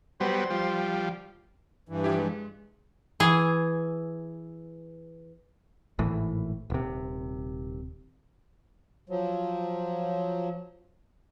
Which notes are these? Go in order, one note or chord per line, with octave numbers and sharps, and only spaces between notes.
F#3 G3 B3 C5
F3 G3
G2 E3
F3 E4 G4
G#3
E3 G#4
G#1 A2 E3
D#1 C3
F3 F#3